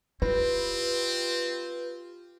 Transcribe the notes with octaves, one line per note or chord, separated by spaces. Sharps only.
C4 E4 F4 G4 B4